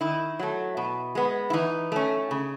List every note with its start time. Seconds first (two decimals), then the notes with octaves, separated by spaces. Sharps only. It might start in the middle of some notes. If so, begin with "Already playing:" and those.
0.01 D#3 E4
0.39 F#3 A3
0.77 B2
1.15 G#3 B3
1.50 E4
1.53 E3 D#4
1.92 A3 C#4
2.31 C#3